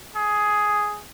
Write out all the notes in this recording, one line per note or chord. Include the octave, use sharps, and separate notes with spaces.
G#4